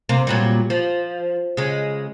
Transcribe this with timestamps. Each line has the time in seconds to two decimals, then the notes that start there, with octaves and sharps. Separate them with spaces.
0.09 C3 A#3
0.27 A#2 F#3 G3
0.70 F3
1.57 C#3 G#3